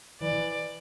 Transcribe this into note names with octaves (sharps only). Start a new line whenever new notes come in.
E3 D5